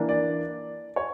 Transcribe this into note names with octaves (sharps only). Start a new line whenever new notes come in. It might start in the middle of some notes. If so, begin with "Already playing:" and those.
Already playing: E3 A#3 D4
D5
C#5